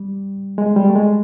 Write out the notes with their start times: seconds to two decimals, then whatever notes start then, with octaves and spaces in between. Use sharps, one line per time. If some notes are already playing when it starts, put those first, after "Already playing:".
Already playing: G3
0.58 G#3
0.76 G3
0.89 A3
0.95 G#3